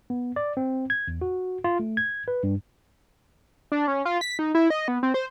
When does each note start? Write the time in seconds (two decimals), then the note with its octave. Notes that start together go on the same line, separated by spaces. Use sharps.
0.10 B3
0.36 D5
0.57 C4
0.90 G#6
1.08 E2
1.21 F#4
1.64 F4
1.79 A3
1.97 G#6
2.28 B4
2.43 G2
3.72 D4
3.88 C#4
4.05 F4
4.21 B6
4.39 D#4
4.55 E4
4.70 D#5
4.88 B3
5.03 C4
5.14 C5